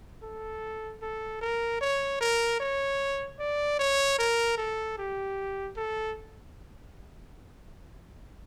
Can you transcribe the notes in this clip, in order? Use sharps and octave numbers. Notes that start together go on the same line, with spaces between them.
A4
A4
A#4
C#5
A#4
C#5
D5
C#5
A#4
A4
G4
A4